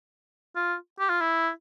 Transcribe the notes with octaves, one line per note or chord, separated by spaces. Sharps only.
F4
G4
F4
E4